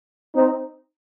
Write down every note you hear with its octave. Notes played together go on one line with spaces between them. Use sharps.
C4 D#4